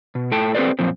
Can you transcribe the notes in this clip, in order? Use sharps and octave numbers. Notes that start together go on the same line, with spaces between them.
B2
A2 A4 G5 A5
C4 G4 A4 B4 C5 D5
F#2 A#2 F3 C4